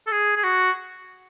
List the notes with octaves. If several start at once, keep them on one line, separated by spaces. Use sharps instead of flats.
A4
G#4
G#4
F#4